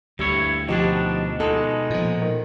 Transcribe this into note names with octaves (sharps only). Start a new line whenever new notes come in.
D2 G2 G3 E4 C#5
B2 F3 D4 D#4 G4
B2 G#3 D#4 A4
A#2 F3
D#3